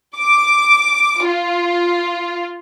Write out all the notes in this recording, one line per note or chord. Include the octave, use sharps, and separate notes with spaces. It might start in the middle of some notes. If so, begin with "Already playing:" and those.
D6
F4